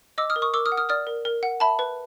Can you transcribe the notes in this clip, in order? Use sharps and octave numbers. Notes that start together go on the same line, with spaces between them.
D#5 D6 E6
D#6 F6
A#4
C#6 D#6
A#4 D6 E6
D#6 F6
F#5
D#6 F6
D5 D#6 F6
A#4
A#4
F#5
E5 A5 B5
B4